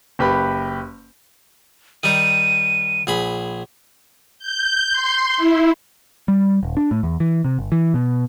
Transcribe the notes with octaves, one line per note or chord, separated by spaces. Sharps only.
F#1 G4 B4 B5
D#3 G3 D#4 D#7
A#1 G#4 B5
G6
C6
E4
G3
D#1
D4
A2
E2
E3
C3
G1
E3
B2